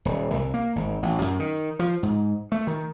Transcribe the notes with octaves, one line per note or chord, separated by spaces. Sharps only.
D#1
C2
A#3
G#1
A1
F#2
D#3
F3
G#2
A3
D#3